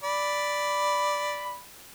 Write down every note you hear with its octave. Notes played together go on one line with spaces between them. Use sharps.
D5 B5